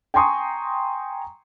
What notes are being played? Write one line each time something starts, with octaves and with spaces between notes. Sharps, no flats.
G5 G#5 A#5 C6 C#6 D#6